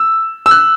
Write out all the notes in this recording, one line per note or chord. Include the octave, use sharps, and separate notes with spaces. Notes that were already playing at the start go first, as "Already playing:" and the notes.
Already playing: E6
E6
F#6